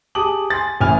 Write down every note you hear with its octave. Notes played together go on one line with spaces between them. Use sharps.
G4 G#4 A5 D6 D#6 F#7
G#5 C6 A6
A1 E3 E4 G#5 F6 F7